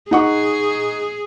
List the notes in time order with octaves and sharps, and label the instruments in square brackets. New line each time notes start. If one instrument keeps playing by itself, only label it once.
[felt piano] D#4 F#5 C#6 [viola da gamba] G#4